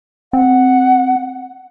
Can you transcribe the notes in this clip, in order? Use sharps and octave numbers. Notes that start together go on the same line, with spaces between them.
C4 F#5